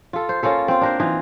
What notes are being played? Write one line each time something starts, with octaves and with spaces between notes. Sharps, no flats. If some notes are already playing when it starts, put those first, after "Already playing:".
F4 A4
C5
A#3 C#4 F4 A4
C4 F4
D4 A#4 C5
E3 D#4 F4